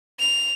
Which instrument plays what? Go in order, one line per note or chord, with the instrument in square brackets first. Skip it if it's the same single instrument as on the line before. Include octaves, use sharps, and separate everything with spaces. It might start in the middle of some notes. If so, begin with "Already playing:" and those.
[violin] F7